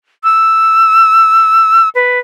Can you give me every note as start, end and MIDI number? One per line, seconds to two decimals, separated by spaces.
0.24 1.89 88
1.95 2.19 71